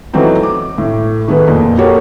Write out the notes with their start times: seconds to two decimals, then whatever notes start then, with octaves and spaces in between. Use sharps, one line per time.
0.13 E3 F#3 A3 B3 C4 D#4
0.43 D6
0.78 A2
1.28 D#3 A3 B3 G#4 B4
1.48 F2 A#2
1.78 A#3 F#4 G4 A4 C#5